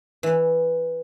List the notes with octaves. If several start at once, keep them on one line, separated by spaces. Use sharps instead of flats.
E3